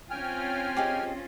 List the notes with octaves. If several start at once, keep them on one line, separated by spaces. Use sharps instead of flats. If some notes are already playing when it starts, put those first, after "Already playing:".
C4 C#4 F4 G5 G#5 F6
G4 G#4 D#5